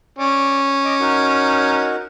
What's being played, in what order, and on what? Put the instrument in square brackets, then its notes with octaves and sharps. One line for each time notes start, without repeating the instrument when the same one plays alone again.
[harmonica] C#4 [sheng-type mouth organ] D5
[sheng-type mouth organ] D#5 C#6 D6
D#4 F#4 A#4